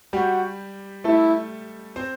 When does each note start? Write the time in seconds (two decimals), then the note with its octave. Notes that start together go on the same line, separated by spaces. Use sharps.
0.13 G3 F#4 G4
1.04 A3 E4 A4
1.96 C4 C5